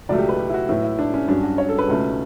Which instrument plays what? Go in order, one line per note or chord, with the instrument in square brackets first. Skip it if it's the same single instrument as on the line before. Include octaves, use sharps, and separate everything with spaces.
[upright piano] C#2 B2 F#3 A3 D5
G4
B4
G4
E4
F#4
A2 F#3 B3 E4
E4
D4
C#4
G2 F#3 C#4 D4
F#4
C#5
A4
B4
C#2 B2 A3 C#4